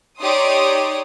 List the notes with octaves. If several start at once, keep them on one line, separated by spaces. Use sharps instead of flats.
D#4 G4 C#5 D5 C6 D#6